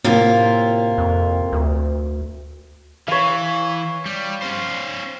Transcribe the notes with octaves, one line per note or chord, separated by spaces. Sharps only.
A2 C3 A#3 F4
F2
D2
E3 C#5 F5
G3
C#4 C5